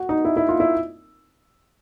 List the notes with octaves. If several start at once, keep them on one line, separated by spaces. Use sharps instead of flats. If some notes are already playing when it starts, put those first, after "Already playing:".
Already playing: F#4
D#4
E4
E4
F4
E4